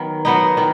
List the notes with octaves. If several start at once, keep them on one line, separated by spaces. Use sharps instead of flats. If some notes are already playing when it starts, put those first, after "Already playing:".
Already playing: D#3 F#3 B3
F#3 B3 D#4
D#3